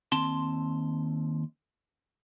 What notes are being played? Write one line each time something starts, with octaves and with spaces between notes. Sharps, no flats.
D#2 C4 A5 C6